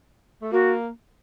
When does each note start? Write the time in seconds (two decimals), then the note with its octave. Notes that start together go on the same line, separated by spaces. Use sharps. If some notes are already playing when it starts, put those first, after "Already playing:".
0.42 A3
0.52 A#3 F#4